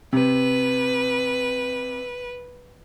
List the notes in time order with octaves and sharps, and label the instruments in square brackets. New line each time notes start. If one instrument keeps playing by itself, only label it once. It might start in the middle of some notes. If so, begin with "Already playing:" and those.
[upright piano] C3 [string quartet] B4